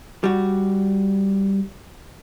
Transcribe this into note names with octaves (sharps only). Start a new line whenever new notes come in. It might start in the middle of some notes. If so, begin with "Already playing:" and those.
G3 F#4